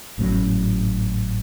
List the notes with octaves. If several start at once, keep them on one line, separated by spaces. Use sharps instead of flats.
G#1 A2 F#3 C#4